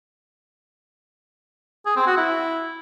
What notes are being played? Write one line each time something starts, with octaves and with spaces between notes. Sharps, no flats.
G#4
C4
F#4
E4